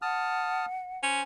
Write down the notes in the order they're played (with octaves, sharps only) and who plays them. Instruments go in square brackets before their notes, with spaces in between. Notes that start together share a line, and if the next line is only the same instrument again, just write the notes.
[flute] F#5 [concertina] A5 D#6 F6
[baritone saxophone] C#4 [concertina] C5